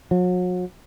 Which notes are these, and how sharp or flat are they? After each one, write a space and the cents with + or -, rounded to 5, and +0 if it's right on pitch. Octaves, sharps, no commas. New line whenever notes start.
F#3 -40